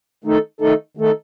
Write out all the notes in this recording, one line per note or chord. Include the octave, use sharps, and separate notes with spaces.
D#3 A3 D#4 A4
D#3 A3 D#4 A4
D#3 A3 D#4 A4